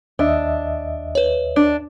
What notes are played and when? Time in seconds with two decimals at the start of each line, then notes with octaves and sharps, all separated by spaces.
0.19 D#2 D4 D#5 E5
1.15 B4 C#5
1.56 D4